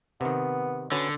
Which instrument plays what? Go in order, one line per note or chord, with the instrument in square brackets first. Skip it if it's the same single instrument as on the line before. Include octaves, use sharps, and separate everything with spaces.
[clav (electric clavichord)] C3 D#3 [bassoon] B3
[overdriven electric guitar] D3 [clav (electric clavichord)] C#4 F#4 B4